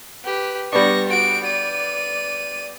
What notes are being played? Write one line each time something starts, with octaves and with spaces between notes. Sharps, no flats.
G4 B4
G3 B3 D4 C#6 A#6
F#4 D7
D5 D#7